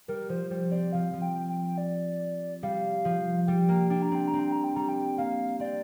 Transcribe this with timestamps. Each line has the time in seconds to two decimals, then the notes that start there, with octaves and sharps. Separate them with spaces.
0.08 G3 A#4
0.29 F3 C5
0.50 G3 C5
0.71 C4 D5
0.93 F3 F5
1.13 F3
1.22 G5
1.49 G5
1.78 D5
2.63 G3 F5
3.05 F3
3.47 G3 G5
3.69 A#3
3.90 D4 G5
4.02 A#5
4.11 C4 G5
4.28 A#5
4.33 C4
4.39 G5
4.52 A#5
4.64 G5
4.76 G3 A#5
4.89 G5
5.18 A#3 F5
5.60 C4 D5